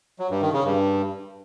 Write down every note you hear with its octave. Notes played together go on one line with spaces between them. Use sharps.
F#3
G2
D#3
C#3
G2